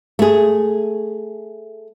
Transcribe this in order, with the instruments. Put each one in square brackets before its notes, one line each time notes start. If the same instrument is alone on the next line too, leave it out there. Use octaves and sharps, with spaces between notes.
[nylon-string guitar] A3 G#4